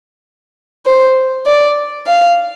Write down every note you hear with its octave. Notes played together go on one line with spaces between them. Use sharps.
C5
D5
F5